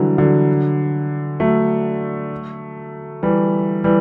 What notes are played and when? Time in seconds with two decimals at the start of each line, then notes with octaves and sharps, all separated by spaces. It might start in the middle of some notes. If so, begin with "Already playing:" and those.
Already playing: D3 E3 F#3 G3
0.18 D3 F#3
1.40 F#3 A3
3.23 E3 G3
3.84 E3 G3